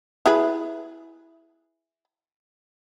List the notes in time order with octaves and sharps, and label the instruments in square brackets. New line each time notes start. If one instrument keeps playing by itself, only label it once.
[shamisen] E4 G#4 B4